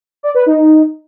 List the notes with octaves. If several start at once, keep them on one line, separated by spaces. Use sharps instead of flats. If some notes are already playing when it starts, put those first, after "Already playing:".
D5
B4
D#4